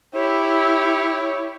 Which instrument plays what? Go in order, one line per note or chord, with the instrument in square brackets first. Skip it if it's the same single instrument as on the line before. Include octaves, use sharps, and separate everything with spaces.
[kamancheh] E4 G4 [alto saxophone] C#5